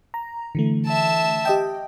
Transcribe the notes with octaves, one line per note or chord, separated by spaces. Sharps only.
A#5
D3 E3 A3
E5 A5
G4 D#5 G5